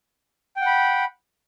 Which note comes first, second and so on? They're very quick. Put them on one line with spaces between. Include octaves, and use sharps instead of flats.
G5 F#5 B5